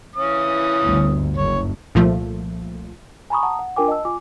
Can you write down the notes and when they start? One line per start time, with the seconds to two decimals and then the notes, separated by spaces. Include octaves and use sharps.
0.16 E3 C#4 D#6
0.83 G1 D2
1.37 F#1 C#5
1.95 C2 A#2 F3 A3
3.30 G#5 A#5 B5 C#6 D#6
3.43 F#5 A5 A#5 D#6
3.59 F#5
3.76 D4 F4 A#4 G5 G#5 D6
3.88 D#5 A5 E6
4.05 F4 G#5 D6